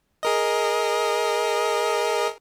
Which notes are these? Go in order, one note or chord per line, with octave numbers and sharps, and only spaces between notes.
G#4 A#4 D#5